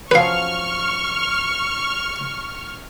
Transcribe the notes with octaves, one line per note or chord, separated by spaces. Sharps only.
F3 F#3 C#4 B4 F5 C#6 F6